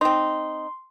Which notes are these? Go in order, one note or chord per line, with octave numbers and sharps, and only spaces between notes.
C4 D#4 C6